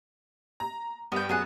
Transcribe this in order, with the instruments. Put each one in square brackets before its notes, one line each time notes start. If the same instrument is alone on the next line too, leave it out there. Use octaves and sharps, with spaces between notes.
[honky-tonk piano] A#5
[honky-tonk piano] G2 [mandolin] B3 G5
[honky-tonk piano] F#2 G#5 [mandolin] B3 G#4 F#5